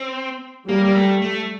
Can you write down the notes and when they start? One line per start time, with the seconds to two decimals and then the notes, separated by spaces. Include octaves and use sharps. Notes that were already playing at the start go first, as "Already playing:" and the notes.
Already playing: C4
0.68 G3 A#3
0.85 A#3
0.95 A3
1.22 A3